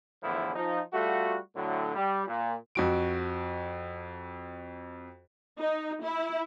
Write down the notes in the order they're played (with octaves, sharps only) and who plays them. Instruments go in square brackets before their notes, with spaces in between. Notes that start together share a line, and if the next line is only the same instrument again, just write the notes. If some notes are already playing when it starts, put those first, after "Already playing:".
[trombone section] E2 A2 D3 E3 F3 E4
F3 D#4
G3 A3 F4 F#4
A2 D3 F#3
G3
A#2
[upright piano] F2 F#4 D7
[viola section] D#4
E4